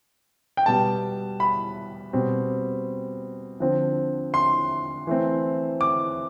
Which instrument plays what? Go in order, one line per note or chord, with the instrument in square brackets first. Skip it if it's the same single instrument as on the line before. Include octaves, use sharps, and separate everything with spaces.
[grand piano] G5
B2 G3 B3 A5
B5
B2 G3 C4
D3 F3 C4
C6
E3 A3 C4
D6